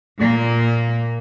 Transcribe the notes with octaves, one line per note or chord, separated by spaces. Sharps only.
A#2 A#3